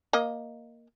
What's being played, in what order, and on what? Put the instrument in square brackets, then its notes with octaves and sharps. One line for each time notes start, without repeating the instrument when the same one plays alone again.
[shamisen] A#3 D#5